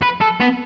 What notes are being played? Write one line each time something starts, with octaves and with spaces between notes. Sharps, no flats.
B4
A4
B3